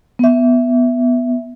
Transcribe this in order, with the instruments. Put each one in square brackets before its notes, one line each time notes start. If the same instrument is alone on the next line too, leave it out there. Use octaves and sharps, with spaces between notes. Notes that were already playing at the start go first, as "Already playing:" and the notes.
[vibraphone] B3 E5